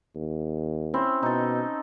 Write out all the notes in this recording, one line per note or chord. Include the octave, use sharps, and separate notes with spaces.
D#2
C4 C#4 E4
B2 D#4 A4